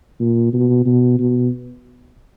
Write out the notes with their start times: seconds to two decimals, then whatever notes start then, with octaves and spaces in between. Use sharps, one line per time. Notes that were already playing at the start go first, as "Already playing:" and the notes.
0.20 A#2
0.53 B2
0.86 B2
1.19 B2